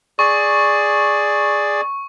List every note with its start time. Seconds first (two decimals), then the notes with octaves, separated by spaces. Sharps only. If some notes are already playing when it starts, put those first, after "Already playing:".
0.19 G#4 D5 C#6